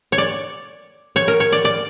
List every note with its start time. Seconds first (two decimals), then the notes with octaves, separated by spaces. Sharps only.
0.12 C#5
0.18 D5
1.16 C#5
1.28 A#4
1.40 C#5
1.52 D5
1.65 D5